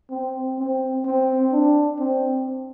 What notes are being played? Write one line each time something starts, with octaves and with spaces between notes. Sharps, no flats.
C4
C4
C4
D4
C4